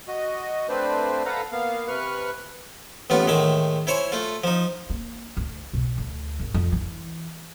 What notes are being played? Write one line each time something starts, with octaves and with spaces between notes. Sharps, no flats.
F#4 D#5
A3 C4 D4 B4 C5 D5
A4 B4 F5 F#5 A#5
A#3 B3 F5
C3 B4 C#6 F6 F#6
A1 A2 B3 F4
A2 D#3 G#3 E5
E4 C5 C#5 G#5
A3 F4
F3 D#4
A#3
D2
B1
D2
G#1
F2
E3